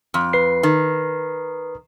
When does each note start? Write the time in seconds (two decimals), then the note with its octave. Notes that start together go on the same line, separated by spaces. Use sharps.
0.14 F2
0.33 B4 C7
0.63 D#3